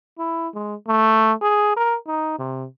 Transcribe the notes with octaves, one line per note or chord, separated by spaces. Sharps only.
E4
G#3
A3
G#4
A#4
D#4
C3